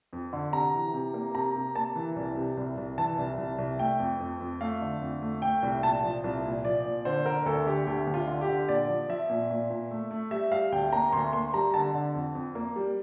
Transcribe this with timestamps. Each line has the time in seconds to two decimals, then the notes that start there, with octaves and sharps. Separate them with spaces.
0.13 F2
0.33 D3
0.53 C3 A#5
0.74 E3
0.94 C3
1.14 A#3
1.35 C3 A#5
1.55 C3
1.75 A#3 A5
1.96 E3
2.16 C2
2.36 C3
2.57 C2
2.78 C2
2.98 E3 A5
3.18 C2
3.38 C2
3.58 C2
3.79 A3 G5
3.99 F2
4.20 F2
4.41 F2
4.61 A3 F5
4.81 D3
5.01 F2
5.22 A3
5.42 A3 G5
5.63 C2
5.83 A#2 A5
6.04 F3
6.24 C2
6.45 A#2
6.65 F3 D5
6.84 A#2
7.05 D3 C5
7.26 D3 A#4
7.46 D2 A4
7.66 D3 G4
7.87 D2 G4
8.07 D2
8.14 F4
8.27 D3
8.41 G4
8.48 D3
8.68 A#2 D5
8.89 F3
9.09 F3 E5
9.30 A#2
9.50 A#2
9.70 A#2
9.91 A3
10.11 A3
10.31 G3 E5
10.52 G3 F5
10.72 D2 G5
10.92 A#3 A#5
11.13 D2 C6
11.33 A#3 C6
11.54 G3 A#5
11.74 D3 A5
11.94 D3
12.15 F2
12.35 F2
12.55 A#3
12.76 G3